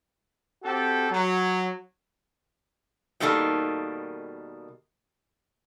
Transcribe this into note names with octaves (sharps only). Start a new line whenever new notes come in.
C4 F#4 G4 A4
F#3
B2 D#3 G3 A#3 D#4 A4